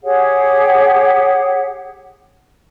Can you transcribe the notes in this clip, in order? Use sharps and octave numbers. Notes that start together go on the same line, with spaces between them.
G4 G#4 C#5 F#5